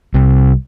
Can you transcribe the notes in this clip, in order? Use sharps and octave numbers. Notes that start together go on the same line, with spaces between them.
C2